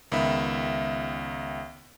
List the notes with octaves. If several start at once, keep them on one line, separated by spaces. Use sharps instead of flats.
C#2 D#3 B3 E5 B5